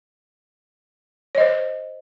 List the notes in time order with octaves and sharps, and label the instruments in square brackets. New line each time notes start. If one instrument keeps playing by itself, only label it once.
[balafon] C#5
D#5
C5